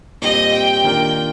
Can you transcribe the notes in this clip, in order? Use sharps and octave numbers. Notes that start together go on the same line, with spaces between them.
A#2 G3 C4 G4 D#5
G5
D#3 A#3 D4 F4 A#4